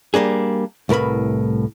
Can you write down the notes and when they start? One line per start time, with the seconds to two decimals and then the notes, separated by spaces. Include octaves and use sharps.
0.14 G3 A#3 D4 G#4
0.89 C2 A2 A#4 B4 B5